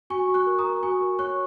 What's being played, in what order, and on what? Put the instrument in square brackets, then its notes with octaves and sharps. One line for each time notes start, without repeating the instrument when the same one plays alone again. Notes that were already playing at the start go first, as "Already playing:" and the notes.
[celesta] F#4 G#5 C#6
F#4
C#6 F#6
A#4
A#5 D#6
A#4
F#4 G#5 C#6
A#4
C#5 C#6 F#6